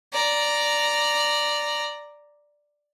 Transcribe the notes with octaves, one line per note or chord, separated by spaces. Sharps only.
D5 A#5